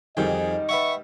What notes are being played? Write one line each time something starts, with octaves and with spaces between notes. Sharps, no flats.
F2 D#3 G3 D#4 G#4 D#5 G5
B4 E5 F#5 C#6